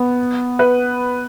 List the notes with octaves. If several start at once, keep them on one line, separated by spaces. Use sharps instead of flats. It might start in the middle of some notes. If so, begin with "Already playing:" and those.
Already playing: B3
B4